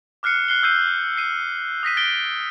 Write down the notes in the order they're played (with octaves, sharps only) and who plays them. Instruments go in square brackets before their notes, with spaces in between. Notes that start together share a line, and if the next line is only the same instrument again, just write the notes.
[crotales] D6 F6 F#6 C7 C#7
F#6 C7 G7
E6 G6 C7 D#7
C7 D#7
D#6 A#6 B6 D#7
A6 D7 G7